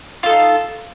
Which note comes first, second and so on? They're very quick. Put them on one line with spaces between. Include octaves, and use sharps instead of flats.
F4 A4 D#4